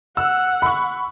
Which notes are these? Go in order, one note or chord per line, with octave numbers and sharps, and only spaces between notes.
F#5 E6
B5 C#6